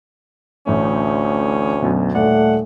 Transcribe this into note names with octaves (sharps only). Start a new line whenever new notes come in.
A1 D2 A3 C#4
F#2 B2
D#1 A3 D5 F#5